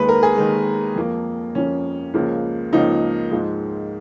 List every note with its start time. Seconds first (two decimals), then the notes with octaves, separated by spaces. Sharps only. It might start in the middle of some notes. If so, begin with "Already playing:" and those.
Already playing: D#2 D#3 G#3 B4
0.09 A#4
0.23 G#4
0.37 D#2 D#3 G#3
0.96 F2 F3 A#3
1.55 F2 F3 A#3 C#4
2.14 C#2 C#3 F3 A#3
2.73 C#2 C#3 F3 A#3 D#4
3.32 G#2 F3 G#3